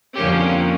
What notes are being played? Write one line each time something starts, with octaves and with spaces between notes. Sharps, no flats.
F2 D3 F3 A#3 C#4 G4